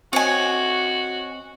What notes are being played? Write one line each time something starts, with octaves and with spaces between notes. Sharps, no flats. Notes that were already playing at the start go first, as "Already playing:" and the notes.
C4 F#4 C#5 D#5 G#5